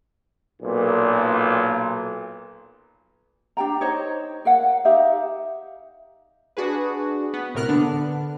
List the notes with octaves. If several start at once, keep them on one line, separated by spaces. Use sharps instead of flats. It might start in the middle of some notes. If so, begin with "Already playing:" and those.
B1 A#2
D4 G4 G5 A#5
D#4 C5 C#5 D#5
A#4 F5 F#5
D#4 G4 E5 F5
D4 F#4 G#4 B4
B3
A2 C3 A#4 F6 F#6
D3 B3 D4